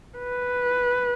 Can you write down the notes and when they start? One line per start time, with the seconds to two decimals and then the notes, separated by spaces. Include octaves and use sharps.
0.18 B4